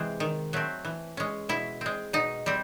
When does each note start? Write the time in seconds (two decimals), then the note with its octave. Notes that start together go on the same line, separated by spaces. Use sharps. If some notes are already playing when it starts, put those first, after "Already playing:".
Already playing: C3 E3 G#3 C4
0.20 D#3
0.53 F#3 A3 C4
0.85 E3
1.17 G#3 C#4
1.49 B2 E4
1.81 G#3 C4
2.13 B2 D#4
2.46 G3 C4